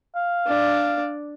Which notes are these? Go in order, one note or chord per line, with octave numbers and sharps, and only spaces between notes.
F5
D4 D5